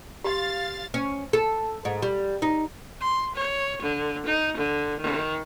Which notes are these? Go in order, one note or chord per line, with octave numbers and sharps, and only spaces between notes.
G4 F5 C6 A6
C#4
A4
G#2
G3
D#4
C6
C#5
D3
D#4
D3
D#3